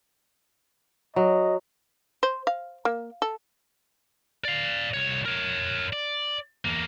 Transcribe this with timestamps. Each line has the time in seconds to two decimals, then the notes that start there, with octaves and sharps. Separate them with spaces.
1.16 F#3 D#5
2.23 C5
2.47 F5
2.85 A#3
3.22 A4
4.45 D5 F5
4.94 C2 C#5
5.25 A#4 C#5
5.93 D5
6.65 E2 A#3